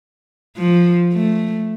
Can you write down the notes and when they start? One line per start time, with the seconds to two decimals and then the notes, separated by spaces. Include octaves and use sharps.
0.57 F3
1.13 A3